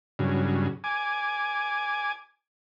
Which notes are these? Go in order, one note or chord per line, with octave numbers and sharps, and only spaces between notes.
G2 C#3 F#3
G#5 D6